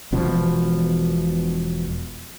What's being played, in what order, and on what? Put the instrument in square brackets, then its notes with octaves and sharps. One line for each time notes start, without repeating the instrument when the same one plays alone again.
[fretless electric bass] E1 B2 F3